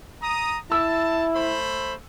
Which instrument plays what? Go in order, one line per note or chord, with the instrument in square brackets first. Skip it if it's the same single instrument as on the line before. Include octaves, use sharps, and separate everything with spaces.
[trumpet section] A#5 D#6
[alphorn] E4 [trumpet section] A5 [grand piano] E6
[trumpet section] A3 C5 B5